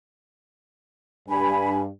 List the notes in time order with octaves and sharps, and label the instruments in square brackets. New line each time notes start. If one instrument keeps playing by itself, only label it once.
[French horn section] G2 [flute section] G#5 B5